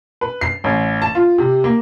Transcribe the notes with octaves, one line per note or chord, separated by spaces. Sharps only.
B4
C7
A1
A5
F4
C3
A#3